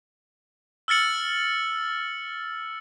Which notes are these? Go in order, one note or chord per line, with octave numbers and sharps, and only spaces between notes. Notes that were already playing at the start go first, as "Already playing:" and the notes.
E6 F6 A6 C#7 F#7